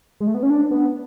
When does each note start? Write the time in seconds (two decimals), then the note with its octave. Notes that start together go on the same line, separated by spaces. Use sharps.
0.21 G#3
0.27 A3
0.34 B3
0.43 C#4
0.50 D4
0.71 B3